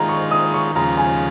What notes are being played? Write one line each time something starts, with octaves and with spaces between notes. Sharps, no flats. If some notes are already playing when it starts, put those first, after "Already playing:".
Already playing: D#3 G#3 F4 A#5
C#6
D#6
C#6
D#2 C#3 F3 G#3 F4 A#5
G#5